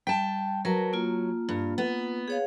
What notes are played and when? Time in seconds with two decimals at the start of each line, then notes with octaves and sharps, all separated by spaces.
0.07 G3 G5 A5
0.65 F#3 A#4 B4 A5
0.93 A#3 F4
1.49 G2
1.78 B3
2.28 G#4 C#5 F5